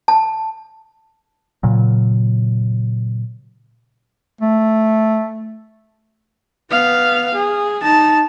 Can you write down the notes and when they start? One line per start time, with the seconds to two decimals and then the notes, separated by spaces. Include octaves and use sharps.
0.08 A5
1.63 A#2 C#3 F#3
4.41 A3
6.71 B3 F5
7.35 G#4
7.82 D#4 A5